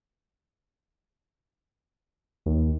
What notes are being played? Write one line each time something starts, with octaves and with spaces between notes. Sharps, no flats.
D#2